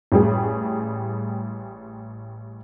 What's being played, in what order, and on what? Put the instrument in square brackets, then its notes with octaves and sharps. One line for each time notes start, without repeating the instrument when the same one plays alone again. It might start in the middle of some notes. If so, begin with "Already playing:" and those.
[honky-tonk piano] A1 G3 G#4